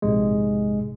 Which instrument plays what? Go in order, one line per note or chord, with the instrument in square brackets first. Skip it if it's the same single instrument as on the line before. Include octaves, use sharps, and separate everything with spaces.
[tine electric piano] A#1 G#2 C3 G#3